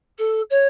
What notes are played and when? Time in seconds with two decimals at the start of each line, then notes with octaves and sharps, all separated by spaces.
0.18 A4
0.50 C#5